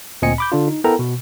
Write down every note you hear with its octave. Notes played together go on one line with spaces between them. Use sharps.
D2 A#2 C4 D#5 G#5 C#7
B5 D6 G6
D3 D4 F4
D#4
B3 E4 A4 A#4 G5 A#5
B2